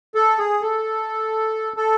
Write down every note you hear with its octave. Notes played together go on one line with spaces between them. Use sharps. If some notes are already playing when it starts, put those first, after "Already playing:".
A4
G#4
A4
A4